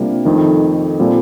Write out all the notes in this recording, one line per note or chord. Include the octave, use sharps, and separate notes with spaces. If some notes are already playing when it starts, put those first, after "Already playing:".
Already playing: C3 G3 A#3 D4 F4
F2 D#3 A3 D#4
A#2 G3 C4 F4 A4